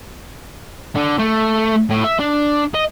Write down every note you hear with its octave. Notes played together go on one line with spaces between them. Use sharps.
D3
A3
A2
E5
D4
D#5